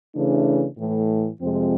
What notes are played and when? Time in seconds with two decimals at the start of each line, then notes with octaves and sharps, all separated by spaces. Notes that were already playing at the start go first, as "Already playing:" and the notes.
0.14 C#3 E3 A3 D4
0.77 A2 E3 A3
1.41 F2 C3 F3 G#3 C4